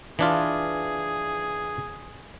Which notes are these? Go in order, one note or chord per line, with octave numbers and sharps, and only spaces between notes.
E3 D4 F4 G#4